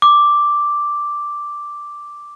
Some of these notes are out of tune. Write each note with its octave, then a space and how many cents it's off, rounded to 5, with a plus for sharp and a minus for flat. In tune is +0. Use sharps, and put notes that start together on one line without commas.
D6 +0